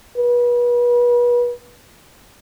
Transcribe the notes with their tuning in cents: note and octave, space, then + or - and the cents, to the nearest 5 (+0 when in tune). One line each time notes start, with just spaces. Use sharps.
B4 -35